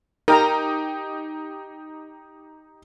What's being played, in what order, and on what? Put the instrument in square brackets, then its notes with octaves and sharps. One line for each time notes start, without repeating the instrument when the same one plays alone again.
[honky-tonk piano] D#4 G4 [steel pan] A#4 A#5